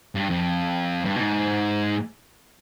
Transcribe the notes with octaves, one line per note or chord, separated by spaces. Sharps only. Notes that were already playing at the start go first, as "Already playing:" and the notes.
G2
F2
G2
B2
G#2